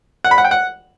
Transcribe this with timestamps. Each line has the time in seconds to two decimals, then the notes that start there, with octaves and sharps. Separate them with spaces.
0.24 F#5
0.31 B5
0.38 F#5
0.45 G5
0.51 F#5